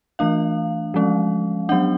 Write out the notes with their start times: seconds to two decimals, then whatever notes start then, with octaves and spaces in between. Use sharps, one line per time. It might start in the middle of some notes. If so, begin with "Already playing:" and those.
0.19 E3 A3 D4 F5
0.94 F3 G#3 C#4
1.69 F#3 B3 D4 F#5